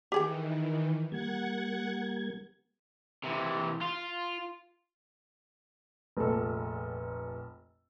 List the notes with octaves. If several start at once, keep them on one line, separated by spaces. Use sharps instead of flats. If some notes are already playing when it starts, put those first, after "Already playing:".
D#3 E3 G4 G#4 G5
G3 A#3 F#5 G#6
C3 E3
F4
F1 A#1 A4